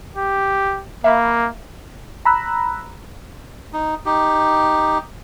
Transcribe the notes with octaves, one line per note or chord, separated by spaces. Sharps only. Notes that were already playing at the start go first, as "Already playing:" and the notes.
G4
A#3 E5 F5 B5
A#5 B5 E6 F#6
D#4
D#4 G4